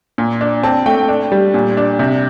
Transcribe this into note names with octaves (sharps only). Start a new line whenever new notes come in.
A#2
D4
C4 A5
A3 G5
D4
G3
A#2
D4
C3